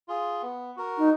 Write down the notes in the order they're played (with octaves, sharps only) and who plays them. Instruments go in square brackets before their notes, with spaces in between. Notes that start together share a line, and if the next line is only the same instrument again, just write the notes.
[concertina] F4 G#4
B3
F#4 A#4
[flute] D#4